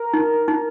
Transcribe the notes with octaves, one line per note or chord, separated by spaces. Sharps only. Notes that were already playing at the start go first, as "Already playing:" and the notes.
Already playing: A#4
D#4
D#4